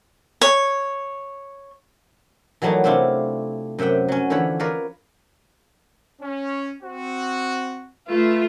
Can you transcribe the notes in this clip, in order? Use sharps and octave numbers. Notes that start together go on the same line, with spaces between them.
C#5
E3 F#3 G3 A3 A#3 D#4
C3 A3 C4 D4 E4 F4
F#2 C3 E5 F#5 G5
F#3 C#4
D3 E3 F3 C#5 B5
A#4 B4 C#5 D5 F5
C#4
C4 F#4
A3 F4 B4 E5